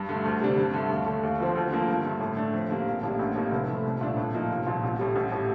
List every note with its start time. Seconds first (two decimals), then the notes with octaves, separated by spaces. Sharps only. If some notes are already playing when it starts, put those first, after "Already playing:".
Already playing: G2
0.09 D3 A3
0.25 D2
0.41 C3 G3 D4
0.58 G2
0.73 D3 A3
0.90 D#2
1.06 D3 A3
1.23 D#2
1.40 D3 F3 C4
1.55 D2
1.72 D3 F3 A#3
1.88 G2
2.05 D3 A3
2.21 A2
2.37 A3 D4
2.54 F2
2.70 D3 G3 A#3
2.87 A#1
3.03 A2 G3 A#3 D4
3.19 A1
3.36 A2 G3 A#3 D#4
3.51 F1
3.68 F2 D3 A3
3.85 C2
4.01 A#2 A3 D4
4.17 A2
4.34 F3 A#3 D#4
4.50 C2
4.67 A#2 F3
4.83 A1
4.99 A2 G3
5.16 A1
5.32 A2 G3